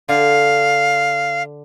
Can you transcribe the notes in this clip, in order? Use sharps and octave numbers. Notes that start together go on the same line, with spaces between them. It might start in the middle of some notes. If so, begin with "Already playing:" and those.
D3 F5